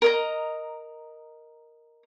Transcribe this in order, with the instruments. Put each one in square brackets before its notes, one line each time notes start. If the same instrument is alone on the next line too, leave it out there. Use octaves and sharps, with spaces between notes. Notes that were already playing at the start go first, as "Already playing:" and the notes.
[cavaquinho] A#4 D#5 A#5